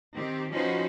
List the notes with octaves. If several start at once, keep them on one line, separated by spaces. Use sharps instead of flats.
D#3 C4 G4
F3 C#4 D#4 F#4 B4 C5